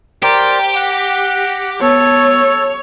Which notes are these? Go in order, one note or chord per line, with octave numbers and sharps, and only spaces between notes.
G4 A#4 C5 D5 A#5
F#5 A#6
B3 A4 C#5